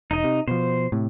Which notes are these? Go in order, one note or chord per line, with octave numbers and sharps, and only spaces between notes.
E1 D#4 D#5
C3
B2 F3 C5
A2 C3